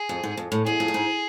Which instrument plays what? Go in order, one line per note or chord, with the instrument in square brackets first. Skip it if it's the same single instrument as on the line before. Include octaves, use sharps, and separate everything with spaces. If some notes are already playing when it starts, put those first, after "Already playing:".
Already playing: [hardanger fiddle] G#4
[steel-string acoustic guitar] F2
G#2
F2
A2
[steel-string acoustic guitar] E2 [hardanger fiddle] G#4
[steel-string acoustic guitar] F2
A2
G#2